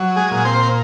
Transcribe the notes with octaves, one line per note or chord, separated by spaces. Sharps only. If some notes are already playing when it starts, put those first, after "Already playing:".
Already playing: F#3
G#3 G#4
A#2
C4 C5